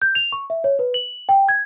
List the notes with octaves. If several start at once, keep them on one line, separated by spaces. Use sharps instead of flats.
G6
F7
C#6
E5
C#5
B4
F#7
G5
G#6